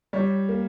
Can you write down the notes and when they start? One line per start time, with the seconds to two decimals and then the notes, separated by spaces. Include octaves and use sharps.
0.13 G3 C#5
0.49 A#3